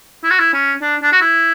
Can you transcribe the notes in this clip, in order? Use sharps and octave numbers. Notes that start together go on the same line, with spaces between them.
E4
F#4
E4
C#4
D4
D4
F#4
E4